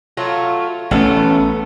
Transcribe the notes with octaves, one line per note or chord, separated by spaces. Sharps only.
F#3 A3 F4
A1 A3 B3 C#4 A4